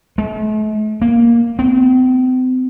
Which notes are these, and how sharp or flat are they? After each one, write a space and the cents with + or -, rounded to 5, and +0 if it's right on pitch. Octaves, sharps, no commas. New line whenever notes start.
A3 -45
A#3 +5
C4 -40